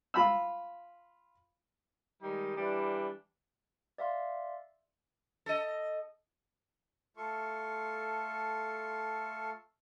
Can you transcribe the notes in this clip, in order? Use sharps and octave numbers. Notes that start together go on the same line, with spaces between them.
F4 B5 E6
D#3 G3 G#3 D#4
E3 G3 D4
D5 E5 F5 C6
A4 D#5
A3 F4 A4 C6 C#6